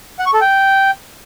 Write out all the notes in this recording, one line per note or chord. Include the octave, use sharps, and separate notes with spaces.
F#5
C#6
A4
G5